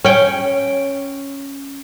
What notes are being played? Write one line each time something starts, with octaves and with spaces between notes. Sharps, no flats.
C#4 G5